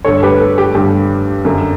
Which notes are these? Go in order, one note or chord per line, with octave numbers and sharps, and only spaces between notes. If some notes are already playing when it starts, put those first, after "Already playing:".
G2 D3 A4 C#5
G4 B4
A4
G4
G2 D3 G4
F#2 D3